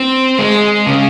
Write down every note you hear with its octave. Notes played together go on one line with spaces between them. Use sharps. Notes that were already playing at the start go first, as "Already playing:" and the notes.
Already playing: C4
G#3
C#3